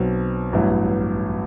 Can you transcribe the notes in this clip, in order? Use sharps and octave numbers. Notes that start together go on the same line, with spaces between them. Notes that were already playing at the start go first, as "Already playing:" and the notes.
Already playing: B1 B2 F#3 C4
A1 G2 F#3 B3 E4